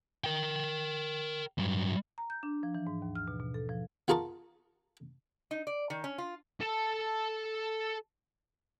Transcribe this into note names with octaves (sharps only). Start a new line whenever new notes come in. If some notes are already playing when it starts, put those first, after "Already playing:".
A#4 G5
G2 F#3
A#5
G6
D4
F3
E3
G#2
D#2
F6
B2
B2
A4
F3
B3 F4 G#4 A#4 A5 C#6
D#4
D5
D#3
C#4
F4
A4 A5